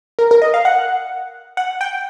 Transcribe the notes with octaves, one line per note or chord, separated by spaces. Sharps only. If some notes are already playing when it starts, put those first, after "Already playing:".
A#4
A#4
D#5
F5
F#5
F#5
G5